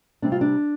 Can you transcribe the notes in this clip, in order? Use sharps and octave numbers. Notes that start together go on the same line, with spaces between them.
C3 G3 C4 D4
F4
D4